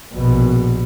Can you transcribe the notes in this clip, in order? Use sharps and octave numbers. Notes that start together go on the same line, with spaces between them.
A#1 B2